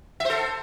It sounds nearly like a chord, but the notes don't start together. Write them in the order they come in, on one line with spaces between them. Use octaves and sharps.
E5 C5 A4